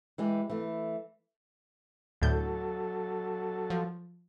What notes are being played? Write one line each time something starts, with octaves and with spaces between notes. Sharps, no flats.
E3 G#3 G4
E3 A3
D2 A2 F#3 A4 G6
F3